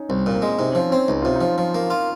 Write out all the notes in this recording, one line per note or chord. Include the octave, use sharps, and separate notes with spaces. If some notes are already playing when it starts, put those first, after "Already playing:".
Already playing: C#4 D#4
C2 C4
A#2 C4
A#3
G#3
C3 D#4
C#4
F3 C4
C4 C#4
C#2 D#4
C3 F4
D#4
F3
F3
A#3
F4